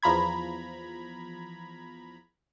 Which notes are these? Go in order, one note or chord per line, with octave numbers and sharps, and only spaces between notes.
E2 F3 A#5 B5 G#6